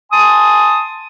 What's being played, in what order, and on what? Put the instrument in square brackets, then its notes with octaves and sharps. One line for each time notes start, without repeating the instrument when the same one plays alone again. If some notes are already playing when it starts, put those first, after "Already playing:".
[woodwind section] G#5 A5 C6 D#6